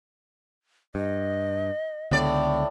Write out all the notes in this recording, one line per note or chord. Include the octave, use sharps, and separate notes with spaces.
G2 D#5
C#2 A2 D3 B3 D5